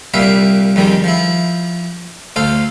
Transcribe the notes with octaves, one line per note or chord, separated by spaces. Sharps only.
C2 A#2 G3 E5 F5
F2 D#3 G3 G#3
F3 E4
D2 A4 C5 F5